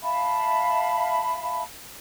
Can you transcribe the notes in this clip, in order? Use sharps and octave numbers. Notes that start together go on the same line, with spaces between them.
E5 F5 A5 B5